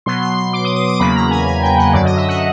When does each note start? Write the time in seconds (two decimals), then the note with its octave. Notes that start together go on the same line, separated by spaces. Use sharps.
0.06 B2 F#3 B3 C6
0.22 C6
0.37 C6
0.53 D6
0.65 D#6
0.76 D#6
0.88 D6
1.00 E2 C#3 F#3 A#3 B5
1.15 A#5
1.31 G#5
1.47 G#5
1.62 G5
1.78 F#5
1.93 F#2 D3 F#3 D5
2.05 D#5
2.17 E5
2.29 F#5